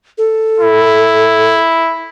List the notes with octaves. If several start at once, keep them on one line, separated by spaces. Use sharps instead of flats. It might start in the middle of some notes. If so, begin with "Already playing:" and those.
A4
E4